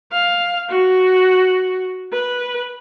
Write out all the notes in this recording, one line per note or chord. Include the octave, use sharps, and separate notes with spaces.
F5
F#4
B4